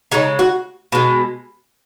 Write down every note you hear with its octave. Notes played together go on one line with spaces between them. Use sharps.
C#3 G#3 D#4
F#4
B2 G#3